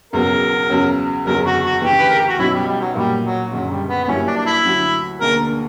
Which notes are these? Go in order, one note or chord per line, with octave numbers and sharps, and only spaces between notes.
E1 E2 C#3 F#3 B3 A#4
E2 C#3 F#3 C#4
F#1 E2 D3 F#3 A#4
F#4
F#4
D2 C#3 E3 G4
B4
A#4
G4
F#4
B1 B2 F#3 C#4 E4
G3
G3
F#3
A#2 F#3 G3 A#3
F#3
F#1 F#2 D3 F#3
G3
B3
B3
G2 F#3 A#3 C#4 E4 G4
D4
D4
E4
D2 D3 F#3
E1 D2 D3 A#3 D4 A#4